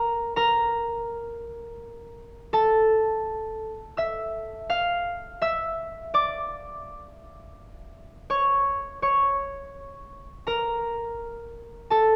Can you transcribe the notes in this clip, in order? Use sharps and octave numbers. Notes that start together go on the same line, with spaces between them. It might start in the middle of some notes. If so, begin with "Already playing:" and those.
Already playing: A#4 A#5
A#4 A#5
A4 A5
E5 E6
F5 F6
E5 E6
D5 D6
C#5 C#6
C#5 C#6
A#4 A#5
A4 A5